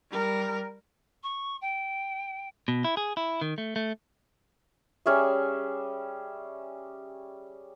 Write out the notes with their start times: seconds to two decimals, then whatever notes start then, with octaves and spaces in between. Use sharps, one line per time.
0.10 G3 A#4
1.23 C#6
1.61 G5
2.68 B2
2.84 E4
2.97 G#4
3.17 E4
3.41 D#3
3.58 A3
3.76 A3
5.06 G3 C#4 G#4 E5